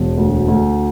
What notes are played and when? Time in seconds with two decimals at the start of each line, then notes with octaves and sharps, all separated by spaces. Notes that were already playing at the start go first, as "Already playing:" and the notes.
Already playing: E1
0.17 D2
0.48 D2